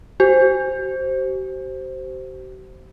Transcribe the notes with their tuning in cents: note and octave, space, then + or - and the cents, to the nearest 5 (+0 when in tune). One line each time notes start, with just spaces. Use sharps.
G4 -45 C5 +0